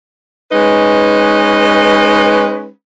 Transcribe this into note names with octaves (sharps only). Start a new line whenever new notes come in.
G#3 C#4 D#4 B4